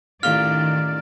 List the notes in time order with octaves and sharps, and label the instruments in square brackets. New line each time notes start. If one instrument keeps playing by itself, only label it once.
[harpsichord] A1 F4 [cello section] D#3 D5 [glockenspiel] F6